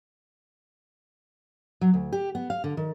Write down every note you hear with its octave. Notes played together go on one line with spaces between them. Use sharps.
F#3
D2
G4
B3
F5
D3
D#3